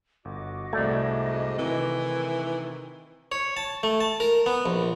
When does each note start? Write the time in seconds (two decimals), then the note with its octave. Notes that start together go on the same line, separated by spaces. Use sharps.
0.25 G1 F#4 D#5 D6
0.73 C2 G#2 A3 D5 G#6
1.58 C3 D#3 E3
3.32 C#5
3.57 A5
3.83 A3
4.01 A5
4.20 A#4
4.46 B3
4.66 A#1